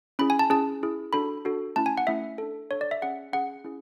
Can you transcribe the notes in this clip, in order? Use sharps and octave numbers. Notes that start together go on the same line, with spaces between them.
C#4 E4 G#4 B5
G#5
A5
C#4 E4 G#4 A5
C#4 E4 G#4
D4 F#4 A4 B5
D4 F#4 A4
A3 C#4 E4 A5
G#5
F#5
A3 C#4 E4 E5
D4 A4
D4 A4 C#5
D5
E5
C#4 G#4 F#5
C#4 G#4 F#5
C#4 E4 G#4